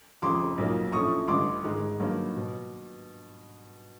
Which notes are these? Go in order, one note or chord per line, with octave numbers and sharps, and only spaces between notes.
F1 F2 C#3 F3 C6 D6
B1 A#2 F#3 A#3 D#4
A#1 A2 F3 A3 C#4 C#6 D#6
A1 G2 D3 C6 D6
G#1 G#2 D#3 G#3
G2 D#3 F#3 A#3 D#4
B2